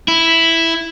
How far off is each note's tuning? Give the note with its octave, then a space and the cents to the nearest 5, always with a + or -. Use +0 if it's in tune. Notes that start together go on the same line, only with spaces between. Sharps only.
E4 +0